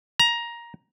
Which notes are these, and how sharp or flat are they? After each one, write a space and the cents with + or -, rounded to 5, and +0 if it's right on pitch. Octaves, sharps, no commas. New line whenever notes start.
A#5 +15